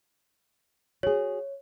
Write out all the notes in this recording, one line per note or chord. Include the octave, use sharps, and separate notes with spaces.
F#4 G#4 C#5